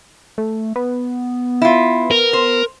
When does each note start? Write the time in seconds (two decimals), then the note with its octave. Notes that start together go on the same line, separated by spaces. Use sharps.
0.38 A3
0.76 B3
1.62 E4 F4
2.11 A#4
2.33 C5